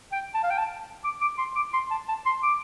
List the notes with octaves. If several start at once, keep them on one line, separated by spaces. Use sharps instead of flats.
G5
A5
F5
G5
A5
D6
D6
C6
D6
C6
A5
A5
C6
D6